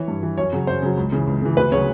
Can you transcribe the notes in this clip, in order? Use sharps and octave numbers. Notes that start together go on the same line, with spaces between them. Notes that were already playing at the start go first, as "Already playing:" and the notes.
Already playing: E3 C#5
G2
E3
F#2 C#5
C#3 F#3
F#2 C5
C#3 F#3
C#2
C#3 E3
C#2
C#3 E3
D2 B4
C#3 F#3 C#5